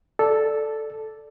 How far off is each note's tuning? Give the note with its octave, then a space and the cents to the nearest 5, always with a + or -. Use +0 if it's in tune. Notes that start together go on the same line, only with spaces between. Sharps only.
A4 +0 D5 +0